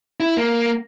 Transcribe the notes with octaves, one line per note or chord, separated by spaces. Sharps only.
E4
A#3